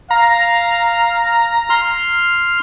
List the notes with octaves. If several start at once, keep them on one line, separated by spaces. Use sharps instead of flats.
F5 A#5
C6 F6